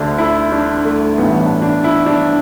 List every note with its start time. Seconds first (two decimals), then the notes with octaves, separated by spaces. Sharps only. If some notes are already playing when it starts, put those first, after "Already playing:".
Already playing: D2 D3 D4
0.18 E4
0.52 D4
0.84 A3
1.02 A3
1.18 A1 G2 E3 B3
1.40 D4
1.62 D4
1.84 E4
2.06 D4